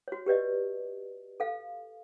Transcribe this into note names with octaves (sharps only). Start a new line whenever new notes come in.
F#4 C#5
G4 B4 D5 D#5
A4 F5